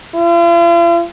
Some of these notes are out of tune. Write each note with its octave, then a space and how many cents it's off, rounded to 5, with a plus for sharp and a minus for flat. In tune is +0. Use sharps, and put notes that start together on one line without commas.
F4 -45